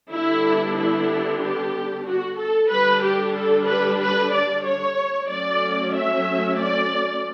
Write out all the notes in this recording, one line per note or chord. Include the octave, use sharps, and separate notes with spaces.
D3 G3 B3 D4 E4
E4
G4
F#4
A4
D3 G3 D4 B4
G4
A4
B4
B4
D5
C#5
F#3 A3 C#4 D5
E5
D5